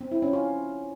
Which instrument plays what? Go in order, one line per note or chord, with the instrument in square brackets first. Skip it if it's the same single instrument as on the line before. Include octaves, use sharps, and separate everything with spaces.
[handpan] C4
E4
C#4
F4